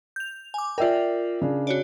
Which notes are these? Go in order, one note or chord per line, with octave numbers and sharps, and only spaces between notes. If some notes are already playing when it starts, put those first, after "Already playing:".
G6 F7
G#5 D6
F4 A#4 D5 E5 G5
C#3 D4
F#4 C#5 D5